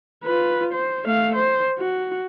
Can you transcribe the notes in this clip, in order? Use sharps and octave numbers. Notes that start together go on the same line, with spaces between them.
F4 B4
C5
A3 F5
C5
F#4